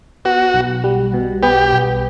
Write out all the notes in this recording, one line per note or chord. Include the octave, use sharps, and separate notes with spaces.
B3 F#4
B1
G3
B2
B3 G4
B1